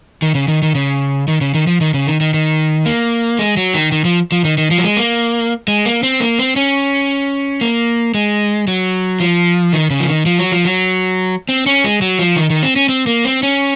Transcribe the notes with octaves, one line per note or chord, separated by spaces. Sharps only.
D#3
C#3
D#3
D#3
C#3
D#3
C#3
D#3
F3
D#3
C#3
D#3
D#3
D#3
A#3
G#3
F#3
D#3
D#3
F3
F3
D#3
D#3
F3
F#3
G#3
A#3
G#3
A#3
C4
A#3
C4
C#4
A#3
G#3
F#3
F3
D#3
C#3
F3
D#3
F3
F#3
F3
F#3
C4
C#4
G#3
F#3
F3
D#3
D#3
C4
C#4
C4
A#3
C4
C#4